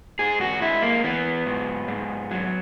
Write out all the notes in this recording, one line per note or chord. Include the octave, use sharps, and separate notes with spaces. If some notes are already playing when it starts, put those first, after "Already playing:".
G#2 G#4
F#4
G#3 E4
A#3
E3 B3
G#2
G#2
F#3